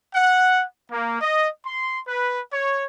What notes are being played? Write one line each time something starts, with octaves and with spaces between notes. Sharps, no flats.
F#5
A#3
D#5
C6
B4
C#5